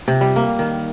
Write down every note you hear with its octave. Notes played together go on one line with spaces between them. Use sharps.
C3
G3
A#3
D#3